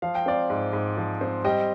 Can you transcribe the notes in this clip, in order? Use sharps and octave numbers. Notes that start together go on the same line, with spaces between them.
F3 F5
G5
C4 D5 F5
G#2
G#2
F3
C4
G3 D#5 G5